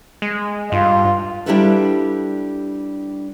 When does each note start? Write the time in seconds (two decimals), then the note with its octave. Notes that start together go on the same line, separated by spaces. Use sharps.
0.22 G#3
0.72 G2 F4
1.46 G3 D4 E4 G4 A4 B4